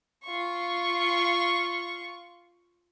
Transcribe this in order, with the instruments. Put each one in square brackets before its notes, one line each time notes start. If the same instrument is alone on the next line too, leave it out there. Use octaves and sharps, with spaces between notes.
[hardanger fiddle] F4 C#6